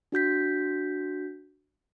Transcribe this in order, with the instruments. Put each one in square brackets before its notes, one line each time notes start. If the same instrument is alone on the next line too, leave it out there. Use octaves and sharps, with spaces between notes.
[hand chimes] D4 F#4 G6 B6